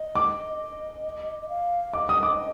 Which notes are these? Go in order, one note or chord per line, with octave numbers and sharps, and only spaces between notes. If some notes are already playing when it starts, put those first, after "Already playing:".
Already playing: D#5
D6
D#5
F5
D#5 D6
D#6
D6